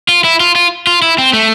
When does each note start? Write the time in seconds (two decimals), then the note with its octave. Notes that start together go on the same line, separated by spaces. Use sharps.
0.09 F4
0.24 E4
0.40 F4
0.55 F4
0.87 F4
1.02 E4
1.18 C4
1.33 A3